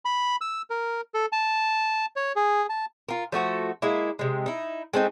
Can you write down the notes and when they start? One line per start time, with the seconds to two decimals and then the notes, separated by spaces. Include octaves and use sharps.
0.05 B5
0.41 E6
0.70 A#4
1.14 A4
1.32 A5
2.16 C#5
2.36 G#4
2.69 A5
3.09 F4 A#4
3.32 F3 A3 F#4 A4
3.82 G#3 A#3 E4
4.19 C3 G#3
4.46 D#4 E4
4.94 G#3 A3 C4 D#4